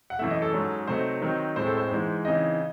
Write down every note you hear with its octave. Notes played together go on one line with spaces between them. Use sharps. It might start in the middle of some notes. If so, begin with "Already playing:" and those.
F#5
F#2 E3 A3 E5
D#5
A4
G#2 F#3 C#4
C3 F#3 A3 D#4 C5
D#3 F#3 C4 D#4
A2 G#3 C4 C5
A4
C5
G#2 E3 G#3
C#3 E3 C4 D#4 D#5